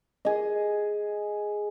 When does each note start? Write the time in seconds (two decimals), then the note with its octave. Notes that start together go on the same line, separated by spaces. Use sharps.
0.25 G#4 D#5